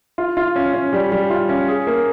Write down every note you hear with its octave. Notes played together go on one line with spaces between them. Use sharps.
F4
F4
C#4
C#4
G3
G3
F4
C#4
G#4
A#3